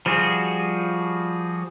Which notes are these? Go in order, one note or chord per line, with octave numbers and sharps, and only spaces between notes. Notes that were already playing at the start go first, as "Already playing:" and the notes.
F3 G3 F#4 G#4